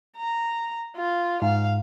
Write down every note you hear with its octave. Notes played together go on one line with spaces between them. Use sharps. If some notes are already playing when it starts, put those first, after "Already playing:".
A#5
F4
G#2 F5